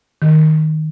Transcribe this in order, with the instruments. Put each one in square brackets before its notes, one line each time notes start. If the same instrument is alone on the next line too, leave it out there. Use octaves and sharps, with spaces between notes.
[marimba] D#3